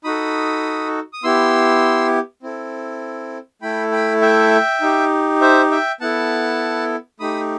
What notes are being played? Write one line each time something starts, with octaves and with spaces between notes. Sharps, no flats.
D#4 F#4 A4 B5 D#6
D#6
B3 E4 G4 C6 E6
C4 E4 A4
A3 E4 A4 G5 B5
G5 B5
E5 G5
D#4 G4
C5 E5
E5 G5
B3 E4 A4 F#5 A5
A3 D#4 G4 B5 D#6